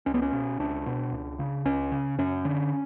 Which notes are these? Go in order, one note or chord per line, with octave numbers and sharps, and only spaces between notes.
C#2 C#4
B3
C#4
B2
C#2 D4
B2
C#2
C#3
C#2 C#4
C#3
F#2 C#4
D3